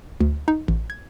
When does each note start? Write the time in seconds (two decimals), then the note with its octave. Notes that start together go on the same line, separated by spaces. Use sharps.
0.21 D2
0.48 D#4
0.68 A1
0.90 G#6